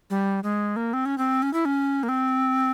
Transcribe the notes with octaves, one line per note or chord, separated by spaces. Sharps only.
G3
G#3
A#3
C4
C#4
C4
C#4
E4
C#4
A#3
C4